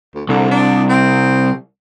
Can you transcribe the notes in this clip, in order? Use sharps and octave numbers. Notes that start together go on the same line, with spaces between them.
D2
C2 D3
D4
C4